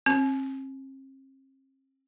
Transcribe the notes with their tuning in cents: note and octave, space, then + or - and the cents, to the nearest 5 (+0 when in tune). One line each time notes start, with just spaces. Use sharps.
C4 +40